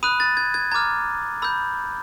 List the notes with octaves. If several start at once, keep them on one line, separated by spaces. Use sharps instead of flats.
B5 D#6 F#6 D#7
A6
G#6
G#6
A#5 D6 F6 G#6
B5 E6 G6